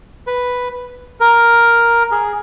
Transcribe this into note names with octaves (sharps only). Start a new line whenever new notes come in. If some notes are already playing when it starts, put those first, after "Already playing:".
B4
A#4
G#4